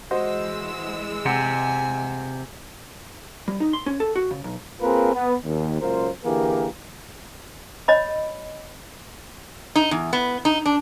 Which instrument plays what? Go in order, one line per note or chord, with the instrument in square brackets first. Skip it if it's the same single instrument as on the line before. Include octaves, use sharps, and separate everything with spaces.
[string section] E3 G#3 E6 [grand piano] F#4 C5 D#5
[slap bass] C3 [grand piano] F#5 [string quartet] G#5
[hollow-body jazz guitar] G3
D#4
C6
C#4
A4
F#4
C#3
B1
[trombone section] A#3 C4 F4 G#4 A#4 B4
B3 B4
D#2
C#2 F#2 A#2 F4 A#4 C5
D3 E3 A#3 G4 G#4 A#4
[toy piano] C#5 D#5 B5
[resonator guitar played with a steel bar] D#4
E2
B3
D#4
D4